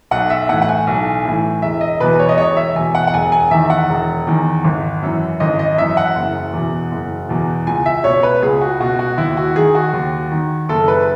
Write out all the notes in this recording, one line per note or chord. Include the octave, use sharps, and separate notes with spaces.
B1 F#5
E5
A2 E3 F#5
F#5
G#5
B1
A2 E3
E1 E5
D#5
E2 B2 B4
C#5
D#5
E1 C#5
E5
E2 B2 G#5
F#5
F#5
E1 G#5
G#5
E2 D#3 E5
F#5
E1
E2 D#3
G#1
F#2 E3
G#1 D#5
D#5
F#2 E3 E5
F#5
F#1
E2 B2
F#1
E2 B2
C#2 G#5
E5
B2 C#5
B4
C#2 G#4
F#4
B2 F#4
F#4
D#2 E4
F#4
D#3 G#4
F#4
D#2
D#3
F#1 A4
B4